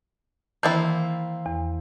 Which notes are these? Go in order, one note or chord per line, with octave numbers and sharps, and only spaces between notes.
D#3 E3 A#3 C4 E4 A6
E2